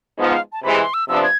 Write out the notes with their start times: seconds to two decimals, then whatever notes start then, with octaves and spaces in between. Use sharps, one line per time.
0.18 G#2 F3 B3
0.30 F5
0.52 A5
0.63 C3 E3 G#3 B5
0.79 C6
0.94 E6
1.08 C3 F3 B3 D4 E6
1.24 G#6